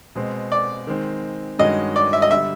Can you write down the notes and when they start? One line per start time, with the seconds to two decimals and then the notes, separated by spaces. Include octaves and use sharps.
0.15 B2 G#3 C4
0.52 D5
0.87 D#3 G#3 C4
1.59 G2 D#3 G#3 C#4 F#4 D#5
1.96 D5
2.13 E5
2.22 D#5
2.31 D3 G3 E5